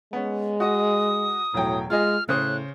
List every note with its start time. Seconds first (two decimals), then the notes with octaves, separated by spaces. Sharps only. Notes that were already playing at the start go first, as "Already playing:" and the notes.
0.13 G#3 B3 C#4
0.60 F#4 D#5 D#6
1.54 E1 A2 F#3 G5
1.90 G#3 F4 G#4 D#5 F6
2.29 A2 C#3 C5 D#6 F#6